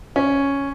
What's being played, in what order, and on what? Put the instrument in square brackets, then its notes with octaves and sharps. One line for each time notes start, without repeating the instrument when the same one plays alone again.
[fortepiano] C#4